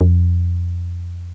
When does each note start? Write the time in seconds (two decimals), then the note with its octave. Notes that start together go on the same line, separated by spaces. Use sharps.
0.01 F2